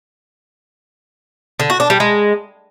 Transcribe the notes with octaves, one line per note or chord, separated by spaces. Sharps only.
D3
F#4
D4
G3
G#3